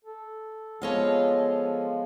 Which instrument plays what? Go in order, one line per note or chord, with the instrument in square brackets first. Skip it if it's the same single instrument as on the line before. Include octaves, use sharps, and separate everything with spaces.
[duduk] A4
[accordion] F3 [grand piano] G#3 B3 [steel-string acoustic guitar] C#5 D#5 F5